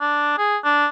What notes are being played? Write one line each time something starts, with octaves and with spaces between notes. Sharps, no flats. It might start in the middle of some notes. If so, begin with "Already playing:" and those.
D4
G#4
D4